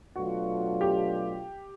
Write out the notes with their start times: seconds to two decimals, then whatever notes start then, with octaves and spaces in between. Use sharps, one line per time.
0.15 B2 F#3 A3 D4 F4 F#4
0.81 G4